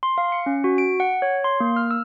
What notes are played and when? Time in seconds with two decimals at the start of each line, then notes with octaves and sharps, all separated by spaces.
0.03 C6
0.18 F5
0.32 C#7
0.46 C#4
0.64 F#4
0.78 D7
1.00 F#5
1.22 C#5
1.44 C6
1.60 A#3
1.76 F6
1.91 E6